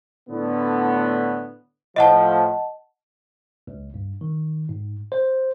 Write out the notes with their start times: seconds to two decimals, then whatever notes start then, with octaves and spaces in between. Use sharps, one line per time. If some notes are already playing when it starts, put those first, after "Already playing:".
0.30 A2 D3 B3
1.96 A2 F3 D#5 F#5 A5
3.67 C#2
3.94 G2
4.21 D#3
4.69 G#2
5.12 C5